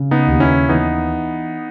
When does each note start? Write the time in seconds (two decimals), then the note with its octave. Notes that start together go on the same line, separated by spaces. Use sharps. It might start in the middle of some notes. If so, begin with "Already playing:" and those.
Already playing: C#3
0.11 B3 D#4
0.27 D#2
0.40 C#4 E4
0.69 E3 B3 D#4